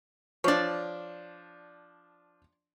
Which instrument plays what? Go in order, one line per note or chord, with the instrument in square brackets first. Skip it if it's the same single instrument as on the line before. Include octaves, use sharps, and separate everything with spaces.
[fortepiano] F3 D4 [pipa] C#5 D5